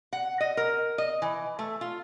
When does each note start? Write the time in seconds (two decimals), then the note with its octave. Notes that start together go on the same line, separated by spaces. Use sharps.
0.13 F#5
0.41 D#5
0.57 A#4
0.98 D#5
1.22 E3
1.59 A3
1.81 F4